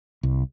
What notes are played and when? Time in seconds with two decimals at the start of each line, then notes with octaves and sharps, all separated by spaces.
0.23 C2